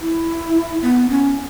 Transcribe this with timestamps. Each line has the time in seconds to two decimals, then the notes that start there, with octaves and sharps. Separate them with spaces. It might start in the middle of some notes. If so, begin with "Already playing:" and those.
0.01 E4
0.82 B3
1.09 C#4